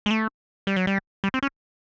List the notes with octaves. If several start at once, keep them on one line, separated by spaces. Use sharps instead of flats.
G#3
A3
G3
F#3
G3
G3
C4
C#4